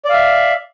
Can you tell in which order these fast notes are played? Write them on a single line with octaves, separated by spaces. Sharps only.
D5 F5 E5